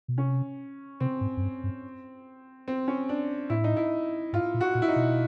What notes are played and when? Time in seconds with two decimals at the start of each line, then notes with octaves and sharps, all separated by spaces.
0.08 B2
0.17 C3 C#4
1.00 C3 C4
1.21 G#2
1.37 F#2
1.42 G2
1.63 G2
2.68 C4
2.88 C#4
3.09 D4
3.50 A2 E4
3.64 D#4
3.77 E4
4.33 G#2 F4
4.54 A#2
4.61 F#4
4.75 A#2
4.82 E4
4.88 D#4
4.96 B2